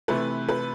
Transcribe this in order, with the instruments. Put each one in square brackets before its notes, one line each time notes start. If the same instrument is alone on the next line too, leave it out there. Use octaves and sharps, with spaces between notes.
[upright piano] C3 E3 A3 B4
B4